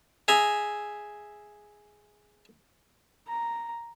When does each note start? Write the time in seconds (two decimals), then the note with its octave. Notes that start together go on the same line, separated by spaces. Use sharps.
0.28 G#4 E5 A#5
3.28 A#5